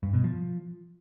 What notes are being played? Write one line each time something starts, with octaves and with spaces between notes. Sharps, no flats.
G2
B2
F3